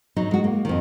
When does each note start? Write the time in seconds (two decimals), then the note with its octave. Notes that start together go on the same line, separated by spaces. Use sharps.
0.16 F#3 D#4
0.31 G#3 F#4
0.44 A#3
0.65 F2 D#3